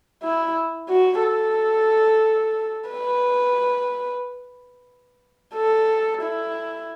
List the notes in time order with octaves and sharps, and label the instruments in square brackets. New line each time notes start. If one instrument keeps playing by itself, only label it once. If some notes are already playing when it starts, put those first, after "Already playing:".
[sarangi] E4
F#4
A4
B4
A4
E4